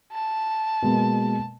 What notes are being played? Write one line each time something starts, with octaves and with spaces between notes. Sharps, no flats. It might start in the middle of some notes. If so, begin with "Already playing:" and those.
A5
B2 G#3 A#3